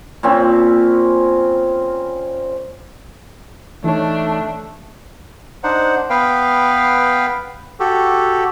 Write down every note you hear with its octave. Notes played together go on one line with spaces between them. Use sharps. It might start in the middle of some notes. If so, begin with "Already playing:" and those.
A#2 C4 C#4 B5
E3 A3 D4 D#4 C#5
D4 D#4 C5 F#5
B3 B4 F5 G5
F#4 G4 A4